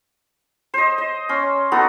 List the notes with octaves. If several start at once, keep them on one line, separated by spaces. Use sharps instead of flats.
C5 D#5
D#5
C#4 C6
B3 D#4 F#4 A4